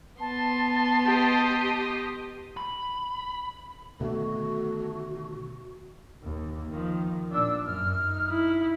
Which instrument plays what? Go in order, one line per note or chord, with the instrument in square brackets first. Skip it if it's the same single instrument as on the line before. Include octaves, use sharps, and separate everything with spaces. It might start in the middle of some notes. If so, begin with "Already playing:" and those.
[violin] B3 C6 [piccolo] A5
[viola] G4 D#5
[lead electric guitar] B5
[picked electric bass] B2 D3 D#3 [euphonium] A3 [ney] F#4
[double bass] D#2
D#3 F3
[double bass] A#2 D4 [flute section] E6
[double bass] F#2 [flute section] F6
[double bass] D#4
[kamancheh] E4